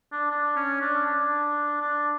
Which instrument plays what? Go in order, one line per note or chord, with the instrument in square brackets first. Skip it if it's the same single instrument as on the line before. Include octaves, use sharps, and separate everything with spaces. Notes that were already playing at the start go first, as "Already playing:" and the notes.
[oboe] D4
D4
C#4
D4
D4
D4